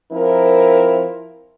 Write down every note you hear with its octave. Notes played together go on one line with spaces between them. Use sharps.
F3 C4 E4 A#4